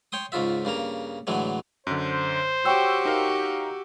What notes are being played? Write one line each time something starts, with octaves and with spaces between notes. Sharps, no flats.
C#5 G5 C6 D#6
C#2 G#2 C#3 F4 E5
G2 C#3 A#3 A#5
A2 D3 E3 F#3 G#3
F#2 D3 C5
F#4 G4 C#5 G5 C#6 E6
D#4 A#4 F5